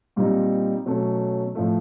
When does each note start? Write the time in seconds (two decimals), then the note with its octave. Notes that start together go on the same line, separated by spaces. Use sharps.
0.16 A#2 G3 C4 D#4
0.85 B2 F#3 A3 C#4
1.55 A2 F3 A3